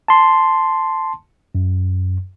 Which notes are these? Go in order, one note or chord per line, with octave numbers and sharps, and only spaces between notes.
A5 C6
F#2